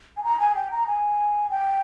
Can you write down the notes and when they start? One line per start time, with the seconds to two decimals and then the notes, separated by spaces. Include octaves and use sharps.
0.17 G#5
0.24 A#5
0.40 G#5
0.55 G5
0.71 A#5
0.87 G#5
1.50 G5